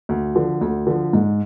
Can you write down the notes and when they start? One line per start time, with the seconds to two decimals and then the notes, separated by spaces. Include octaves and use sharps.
0.09 D2
0.35 D3 F3
0.61 D2
0.87 D3 F3
1.13 G#2